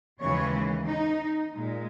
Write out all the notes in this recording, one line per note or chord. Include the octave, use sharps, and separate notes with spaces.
D#2 C#3 E3 G#3 C#5
D#4
A#2 G#3